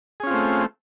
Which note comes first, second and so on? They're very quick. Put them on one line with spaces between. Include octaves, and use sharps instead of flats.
G#4 C#4 F4 C4 A3